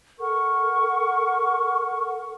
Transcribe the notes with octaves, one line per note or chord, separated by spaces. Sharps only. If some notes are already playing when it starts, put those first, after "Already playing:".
A4 A#4 F#5 C#6